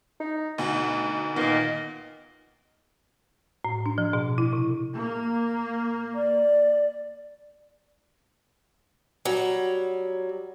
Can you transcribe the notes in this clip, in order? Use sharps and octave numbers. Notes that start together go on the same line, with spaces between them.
D#4
D2 B2 D#4
A#2 D#3 A#3 B3 D#5
A2
D4
F3
B2
E4
C3
A#3
D5
F#3 G3